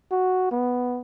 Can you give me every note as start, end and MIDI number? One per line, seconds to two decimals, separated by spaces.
0.11 0.51 66
0.51 1.02 59